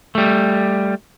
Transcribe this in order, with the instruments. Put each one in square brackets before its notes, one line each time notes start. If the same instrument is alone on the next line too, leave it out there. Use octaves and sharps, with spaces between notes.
[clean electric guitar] G3 A3